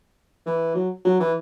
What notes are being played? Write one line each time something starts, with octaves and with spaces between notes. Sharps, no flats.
E3
F#3
F#3
E3